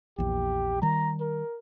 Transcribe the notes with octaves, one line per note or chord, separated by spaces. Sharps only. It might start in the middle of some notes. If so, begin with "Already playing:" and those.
A#1 E2 G4
D#3 G3 A#5
A#4